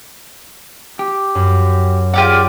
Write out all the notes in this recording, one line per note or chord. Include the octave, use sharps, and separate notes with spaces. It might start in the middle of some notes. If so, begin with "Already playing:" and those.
G4
F#2
F4 G4 G#4 D5 F#5